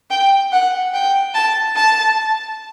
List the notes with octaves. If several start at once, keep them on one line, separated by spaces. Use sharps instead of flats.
G5
F#5
G5
A5
A5